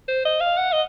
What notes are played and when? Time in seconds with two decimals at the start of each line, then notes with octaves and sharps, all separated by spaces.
0.08 C5
0.25 D#5
0.40 F5
0.57 F#5
0.73 D#5